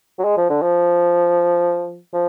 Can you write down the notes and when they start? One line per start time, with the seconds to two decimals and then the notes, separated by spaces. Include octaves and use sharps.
0.18 F#3
0.24 G#3
0.37 F3
0.49 D3
0.62 F3
2.14 F3